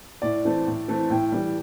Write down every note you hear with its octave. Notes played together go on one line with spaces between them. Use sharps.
A2 D5
E3 A3 C4
A2
E3 A3 C4
A2 G5
E3 G3